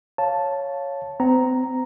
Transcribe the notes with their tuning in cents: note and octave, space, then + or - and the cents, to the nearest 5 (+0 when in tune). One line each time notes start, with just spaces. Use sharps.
C#5 +0 F5 +0 A5 +0
C4 -40 A#5 +0